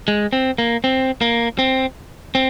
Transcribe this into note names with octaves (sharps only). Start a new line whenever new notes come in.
G#3
C4
A#3
C4
A#3
C4
C4